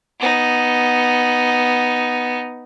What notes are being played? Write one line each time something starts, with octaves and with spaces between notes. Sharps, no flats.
B3 D#4